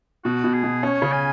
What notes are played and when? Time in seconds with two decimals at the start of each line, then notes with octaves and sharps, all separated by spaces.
0.24 B2 F#4
0.44 B2
0.54 G#4
0.63 B2
0.83 C#4 C#5
1.02 C#3
1.12 G#5